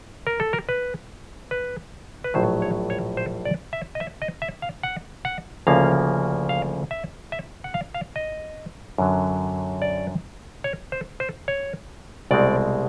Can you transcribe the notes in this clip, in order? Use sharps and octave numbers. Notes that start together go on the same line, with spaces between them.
A#4
A4
A#4
B4
B4
B4
A#1 A2 F#3 C5
C#5
C#5
C5
D5
E5
D#5
E5
D#5
E5
F5
F#5
F#5
D2 C#3 F3 A#3 C#4 F5
F5
E5
E5
F#5
F5
F5
D#5
F#2 D3 F#3
D5
C#5
C5
C5
C#5
C2 B2 G#3 C4 D5